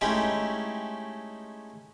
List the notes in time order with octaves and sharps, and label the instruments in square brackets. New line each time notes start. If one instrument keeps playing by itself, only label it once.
[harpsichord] G#3 A3 C#4 D#4 E4 G4